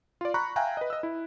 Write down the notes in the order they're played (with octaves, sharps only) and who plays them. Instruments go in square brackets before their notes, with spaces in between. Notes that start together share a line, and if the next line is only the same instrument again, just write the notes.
[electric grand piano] F4 D5
A#5 B5 C#6 F#6
E5 F5 G5 G#5 A#5 F#6
B4 D#5
D#5 E6
E4